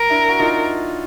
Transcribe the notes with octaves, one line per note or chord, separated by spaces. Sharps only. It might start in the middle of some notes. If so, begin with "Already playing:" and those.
Already playing: A#4
D4 E4
F#4
D#4 F4